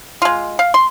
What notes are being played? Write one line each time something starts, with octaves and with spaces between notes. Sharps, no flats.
G#3 F4
F5
C6